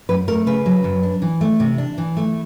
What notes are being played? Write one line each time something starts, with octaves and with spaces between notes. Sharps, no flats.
F#2 B4
A3 A#4
C#3 B4
F#3
F#2
D4
E3
A3
C3
D4
E3
A3